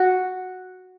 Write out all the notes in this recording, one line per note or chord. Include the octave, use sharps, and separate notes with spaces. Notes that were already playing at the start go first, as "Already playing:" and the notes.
Already playing: F#4